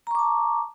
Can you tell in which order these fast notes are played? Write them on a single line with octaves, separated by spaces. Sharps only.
A#5 C#6 D6 A5